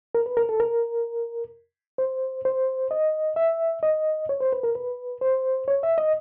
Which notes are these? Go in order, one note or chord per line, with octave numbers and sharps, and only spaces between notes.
A#4
B4
A#4
A4
A#4
C5
C5
D#5
E5
D#5
C#5
C5
B4
A#4
B4
C5
C#5
E5
D#5